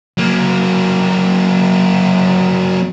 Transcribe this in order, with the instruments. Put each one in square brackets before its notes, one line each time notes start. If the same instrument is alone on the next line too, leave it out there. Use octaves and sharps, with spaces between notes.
[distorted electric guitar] F#3 A#3